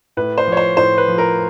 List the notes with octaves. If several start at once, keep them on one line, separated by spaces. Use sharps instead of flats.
A2 B4
C5
F3 C#5
C5
A2 C5
B4
F3
A#4